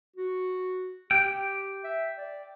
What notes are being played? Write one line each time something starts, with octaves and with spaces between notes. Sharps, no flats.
F#4
G4 G5
E5
D5